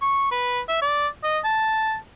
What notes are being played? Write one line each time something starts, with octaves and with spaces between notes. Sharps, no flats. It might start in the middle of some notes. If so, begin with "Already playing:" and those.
C#6
B4
E5
D5
D#5
A5